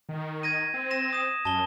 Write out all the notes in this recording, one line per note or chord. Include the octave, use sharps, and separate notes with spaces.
D#3
G#6 A#6 D#7
C4
A#6 E7
D#6 E7
F#2 A5 G7